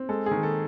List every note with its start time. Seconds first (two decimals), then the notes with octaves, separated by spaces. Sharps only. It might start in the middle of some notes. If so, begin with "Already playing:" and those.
Already playing: C4
0.09 G#3 A4
0.26 G#4
0.31 D#3
0.43 A4